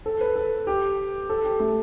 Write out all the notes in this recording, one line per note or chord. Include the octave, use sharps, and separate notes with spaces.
A4
B4
A4
G4
A4
G4
A3